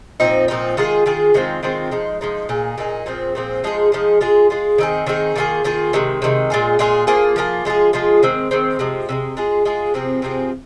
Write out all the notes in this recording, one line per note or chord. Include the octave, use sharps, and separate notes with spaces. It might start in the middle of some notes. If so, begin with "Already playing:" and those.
A#2 F3 C4 D#4
A#2 F3 C4 D#4
D#3 G#3 F4 G#4
D#3 G#3 F4 G#4
D#3 G#3 C4 F4
D#3 G#3 C4 F4
F3 G#3 D#4
F3 G#3 D#4
A#2 A#3 D#4 G#4
A#2 A#3 D#4 G#4
A#2 F3 C4 G#4
A#2 F3 C4 G#4
F3 G#3 D#4 G#4
F3 G#3 D#4 G#4
G#3 F4 G#4
G#3 F4 G#4
D#3 C4 D#4 G#4
D#3 C4 D#4 G#4
D#3 A#3 F4 G#4
D#3 A#3 F4 G#4
C3 D#3 G#3
C3 D#3 G#3
A#2 G#3 F4 G#4
A#2 G#3 F4 G#4
F3 A#3 F4 G#4
F3 A#3 F4 G#4
F3 G#3 F4 G#4
F3 G#3 F4 G#4
D#3 G#3 C4
D#3 G#3 C4
C3 F3 G#3
C3 F3 G#3
G#3 F4 G#4
G#3 F4 G#4
C3 F3 C4 G#4
C3 F3 C4 G#4